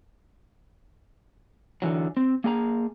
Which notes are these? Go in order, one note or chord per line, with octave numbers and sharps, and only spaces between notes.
D3 E3 F#3
C4
A#3 G#4 G5 A#5